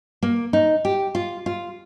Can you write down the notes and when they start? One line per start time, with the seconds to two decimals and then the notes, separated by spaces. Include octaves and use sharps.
0.22 A#3
0.53 D#4
0.85 G4
1.15 F4
1.46 F4